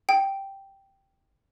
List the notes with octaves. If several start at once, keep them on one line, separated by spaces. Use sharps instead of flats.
G5